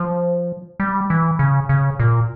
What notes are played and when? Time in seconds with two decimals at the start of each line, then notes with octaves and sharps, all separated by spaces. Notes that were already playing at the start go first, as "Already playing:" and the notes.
Already playing: F3
0.80 G3
1.10 E3
1.39 C#3
1.69 C#3
2.00 A#2